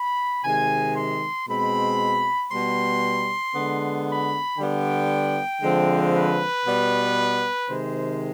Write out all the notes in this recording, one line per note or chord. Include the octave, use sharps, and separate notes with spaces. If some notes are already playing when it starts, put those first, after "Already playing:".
Already playing: B5
C3 D#3 G#3 G#5
C6
B2 G#3 C4 B5
B2 G3 B3 C6
D3 G#3 B3
B5
D3 G3 B3 G5
D3 F3 G#3 C4
B4
B2 G3 B3
C3 D#3 G#3 C5